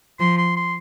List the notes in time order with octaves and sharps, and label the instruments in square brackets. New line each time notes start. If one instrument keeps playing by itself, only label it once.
[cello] F3 [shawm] C6
[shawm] C6
C6